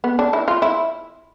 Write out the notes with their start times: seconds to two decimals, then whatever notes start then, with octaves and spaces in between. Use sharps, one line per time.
0.04 B3
0.19 D4
0.33 E4
0.48 F4
0.62 E4